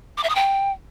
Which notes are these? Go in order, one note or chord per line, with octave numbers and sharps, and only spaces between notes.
D6
E5
D#6
G5